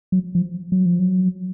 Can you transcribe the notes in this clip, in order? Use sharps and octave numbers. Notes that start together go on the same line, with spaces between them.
F#3
F3
F#3
F3
F#3